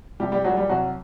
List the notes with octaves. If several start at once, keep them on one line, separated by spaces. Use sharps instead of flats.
C2 G3 G4
G3 G4
A#2 F#3 G3 F#4
G3 G4
C2 F#3 F#4